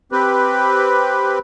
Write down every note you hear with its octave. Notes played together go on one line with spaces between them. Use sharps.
C4 G4 B4